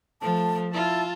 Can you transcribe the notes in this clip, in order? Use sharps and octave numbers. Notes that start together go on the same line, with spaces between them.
F3 A3 A5
E4 F4 A5